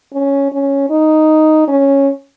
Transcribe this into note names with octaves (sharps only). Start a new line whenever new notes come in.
C#4
C#4
D#4
C#4